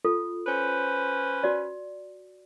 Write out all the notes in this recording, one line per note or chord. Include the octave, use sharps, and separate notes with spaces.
F4 A4
C#4 B4 C5
F#4 D5